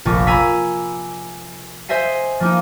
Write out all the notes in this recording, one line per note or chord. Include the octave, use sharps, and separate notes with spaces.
F1 A#1
G#5 A#5 B5 E6 B6
C5 D#5 E5 G#5 C7
F3 A#3 D#4